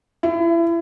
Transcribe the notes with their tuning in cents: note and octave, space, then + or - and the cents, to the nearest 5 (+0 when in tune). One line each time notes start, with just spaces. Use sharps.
E4 +30